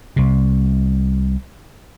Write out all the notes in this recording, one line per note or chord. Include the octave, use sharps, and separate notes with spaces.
C2 C3